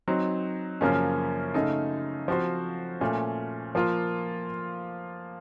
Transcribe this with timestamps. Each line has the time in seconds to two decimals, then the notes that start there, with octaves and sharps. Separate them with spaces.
0.08 F#3 C4 D#4
0.81 F#2 C#3 F3 A#3 C#4
1.54 C#3 A3 D#4 A4
2.28 F3 C4 F#4 C5
3.01 A#2 A3 C#4
3.75 F3 A#3 F4